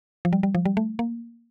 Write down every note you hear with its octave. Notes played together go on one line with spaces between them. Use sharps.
F3
G3
G3
F3
G3
A3
A#3